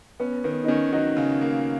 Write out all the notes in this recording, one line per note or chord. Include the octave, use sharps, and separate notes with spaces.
B3 C#4
D#3 B3
D#4
D#3 C#4
F#3 D#4
C#3
A#3